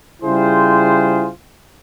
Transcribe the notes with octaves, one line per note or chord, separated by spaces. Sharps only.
C#3 G3 E4 F4 G#4 C5